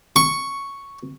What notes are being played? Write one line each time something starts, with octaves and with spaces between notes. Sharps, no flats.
C#6